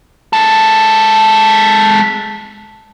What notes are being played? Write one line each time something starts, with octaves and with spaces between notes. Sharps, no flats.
G#3 A4